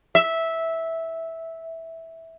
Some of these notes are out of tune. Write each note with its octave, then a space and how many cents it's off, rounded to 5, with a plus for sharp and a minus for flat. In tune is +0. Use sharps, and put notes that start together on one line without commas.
E5 -10